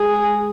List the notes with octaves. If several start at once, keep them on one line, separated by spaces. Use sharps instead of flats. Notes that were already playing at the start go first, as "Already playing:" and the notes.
Already playing: G#3 G#4